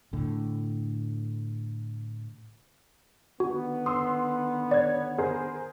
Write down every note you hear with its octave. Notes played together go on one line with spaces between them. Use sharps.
A2 D3
D3 D#3 B3 F#4
C6 D#6 E6
C#5 D5 G#6
G#4 A#4 C5